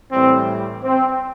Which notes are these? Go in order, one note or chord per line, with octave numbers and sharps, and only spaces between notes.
A2 E3 G3 C4
C4